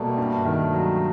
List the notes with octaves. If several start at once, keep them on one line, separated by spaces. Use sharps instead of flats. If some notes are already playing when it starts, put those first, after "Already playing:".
Already playing: B2 G3 A3 A#3
G2
D#3
F#3